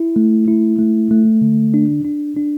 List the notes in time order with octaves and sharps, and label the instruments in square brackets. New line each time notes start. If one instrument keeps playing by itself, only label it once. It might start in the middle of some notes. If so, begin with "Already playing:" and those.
Already playing: [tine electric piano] E4
A3
E4
A3
A3
D3
D4
D4
D4